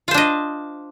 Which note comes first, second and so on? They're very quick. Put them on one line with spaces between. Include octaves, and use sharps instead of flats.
F4 C5 D4 D#5